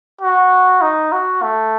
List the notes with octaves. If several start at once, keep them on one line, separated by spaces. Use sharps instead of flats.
F#4
D#4
F#4
A3